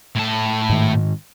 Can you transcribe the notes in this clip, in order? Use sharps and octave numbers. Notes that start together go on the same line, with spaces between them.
A2 A5
G#2 D#3